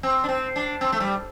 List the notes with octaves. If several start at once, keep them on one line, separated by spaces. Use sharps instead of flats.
C4
D4
C4
D4
C4
A3
G3